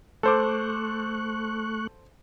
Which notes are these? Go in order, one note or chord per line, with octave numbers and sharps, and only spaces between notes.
A3 A4 C5 C#6 D6 F#6